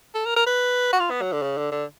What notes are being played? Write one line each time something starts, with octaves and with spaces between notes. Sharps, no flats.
A4
A#4
A#4
B4
F#4
F4
B3
F#3
D3
C#3
D3
D3